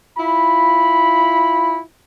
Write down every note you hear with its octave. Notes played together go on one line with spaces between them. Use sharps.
E4 F4 B5